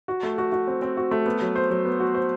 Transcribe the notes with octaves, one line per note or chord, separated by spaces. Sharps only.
F#4
A3
F#4
F#4
C4
C4
F#4
A3
B3
F#3
C5
F#3
B3
F#4
C5